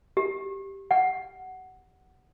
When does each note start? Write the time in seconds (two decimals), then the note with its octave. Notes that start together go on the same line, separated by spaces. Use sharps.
0.17 G4
0.91 F#5